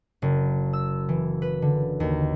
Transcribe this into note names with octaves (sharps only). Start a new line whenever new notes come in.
F#1
E6
E3
B4
D3
D#2